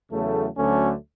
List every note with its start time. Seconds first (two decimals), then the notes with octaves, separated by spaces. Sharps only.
0.10 E2 C#3 F#3 A3
0.57 D2 D3 F#3 A3 C#4